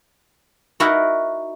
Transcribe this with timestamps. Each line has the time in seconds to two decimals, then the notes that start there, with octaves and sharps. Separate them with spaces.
0.80 D#4 E4 F#4 A#4